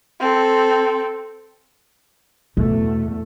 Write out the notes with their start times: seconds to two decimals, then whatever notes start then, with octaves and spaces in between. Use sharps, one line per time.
0.20 C4 A4
2.57 E2 B2 A3